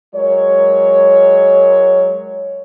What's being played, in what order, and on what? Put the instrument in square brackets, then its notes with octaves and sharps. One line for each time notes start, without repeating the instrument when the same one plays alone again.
[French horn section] F#3 G#3 A#4 C#5